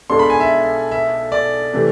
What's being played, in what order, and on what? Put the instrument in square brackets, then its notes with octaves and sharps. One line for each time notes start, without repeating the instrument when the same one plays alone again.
[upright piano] B1 B2 G#3 D4 A4 [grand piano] C6
[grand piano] B5
G#5
E5
E5
D5
[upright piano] C3 E3 A3